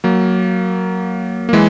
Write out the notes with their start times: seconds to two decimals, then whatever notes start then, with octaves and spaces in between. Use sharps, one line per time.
0.04 F#3 A#3
1.49 A#3
1.53 E3 G#3